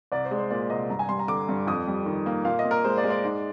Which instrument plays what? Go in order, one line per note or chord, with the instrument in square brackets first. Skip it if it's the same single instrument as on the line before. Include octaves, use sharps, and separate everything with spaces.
[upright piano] C2 D5
C5
G#3
C5
A#2 D5
C2 D#5
G2 A#5
G#5
G3 C6
A#5
D3 D6
G2
F2 D#6
G3
D#3
A#3
A#2 F5
D#5
A#2
A#4
G#3 C5
D5
G#3
D5
G#2